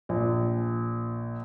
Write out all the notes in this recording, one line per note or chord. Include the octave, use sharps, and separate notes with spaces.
A#1